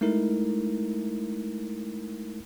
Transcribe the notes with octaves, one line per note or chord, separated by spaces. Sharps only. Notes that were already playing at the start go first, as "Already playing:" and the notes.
G#3 A3 D#4 E4 A#4